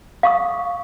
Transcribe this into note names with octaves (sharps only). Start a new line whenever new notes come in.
F5 C#6 D#6